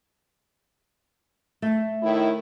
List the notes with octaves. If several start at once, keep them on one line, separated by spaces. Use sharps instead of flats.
A3
A2 D#3 E4